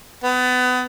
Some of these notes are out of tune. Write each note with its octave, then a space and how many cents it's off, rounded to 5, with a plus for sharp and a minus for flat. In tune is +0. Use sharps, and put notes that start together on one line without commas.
B3 +25